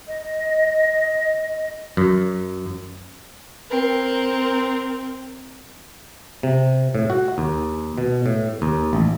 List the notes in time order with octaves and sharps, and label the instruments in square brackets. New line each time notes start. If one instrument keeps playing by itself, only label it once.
[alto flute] D#5
[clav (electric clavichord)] F#2
[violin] C4 A#4
[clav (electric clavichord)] C3
A2
F#4
D#2
B2
A2
D#2
A1